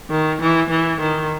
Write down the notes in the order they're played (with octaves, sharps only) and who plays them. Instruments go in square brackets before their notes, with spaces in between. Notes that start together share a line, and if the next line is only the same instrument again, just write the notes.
[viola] D#3
E3
E3
D#3